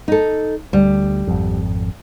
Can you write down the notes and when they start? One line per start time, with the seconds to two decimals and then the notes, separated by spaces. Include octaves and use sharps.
0.08 D#4 A4
0.73 D2 G3
1.27 G#1 F2